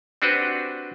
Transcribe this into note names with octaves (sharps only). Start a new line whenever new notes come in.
C4 D4 F#4 G4 B4 C5